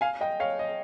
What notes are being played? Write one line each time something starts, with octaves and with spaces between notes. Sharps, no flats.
F5 G#5
D#5 G5
C#5 F5
D#5